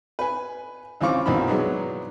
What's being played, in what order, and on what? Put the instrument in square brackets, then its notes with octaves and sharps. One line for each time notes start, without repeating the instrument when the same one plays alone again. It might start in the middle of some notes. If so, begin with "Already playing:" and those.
[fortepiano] B4 G#5
C#2 E3 C4 F4 C#6 D6
B1 E3 A#3 C4 D4 B5
F#3 G#3 B3 D4 D#4